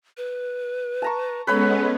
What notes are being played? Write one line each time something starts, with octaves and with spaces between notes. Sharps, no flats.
B4
A5 A#5 C#6
G#3 B3 C#4 A4 B4 C#5 B5